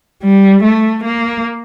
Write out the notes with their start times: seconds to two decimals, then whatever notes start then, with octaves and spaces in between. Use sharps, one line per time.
0.23 G3
0.64 A3
1.05 A#3